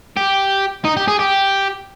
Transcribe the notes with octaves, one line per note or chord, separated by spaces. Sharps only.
G4
D#4
G4
G#4
G4